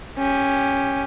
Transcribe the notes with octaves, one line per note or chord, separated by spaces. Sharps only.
C#4 G4